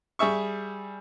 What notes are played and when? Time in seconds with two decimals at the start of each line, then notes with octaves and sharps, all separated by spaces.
0.19 G3 G#4 E5 C#6